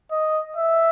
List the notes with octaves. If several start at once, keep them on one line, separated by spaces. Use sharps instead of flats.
D#5
E5